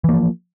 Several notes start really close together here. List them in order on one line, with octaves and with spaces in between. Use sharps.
E3 A#3 F3